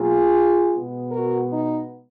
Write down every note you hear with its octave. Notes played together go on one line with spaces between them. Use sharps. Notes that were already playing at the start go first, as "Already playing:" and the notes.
Already playing: B2 F#3 A#3 F4 G#4
B2 G#3 B3
F#4 A#4
D#4